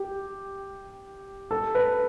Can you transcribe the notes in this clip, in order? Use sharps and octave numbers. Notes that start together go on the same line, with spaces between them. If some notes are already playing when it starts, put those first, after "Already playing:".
Already playing: G4
A4
B4